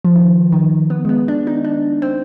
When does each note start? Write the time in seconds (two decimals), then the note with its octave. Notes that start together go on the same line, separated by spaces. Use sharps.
0.05 F3
0.16 D#3
0.52 D#3
0.90 B3
1.05 G#3
1.09 B3
1.28 D4
1.47 D#4
1.65 D4
2.02 C4